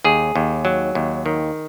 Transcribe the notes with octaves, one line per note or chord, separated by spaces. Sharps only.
D#2 G#4
D#2
F#3
D#2
D#3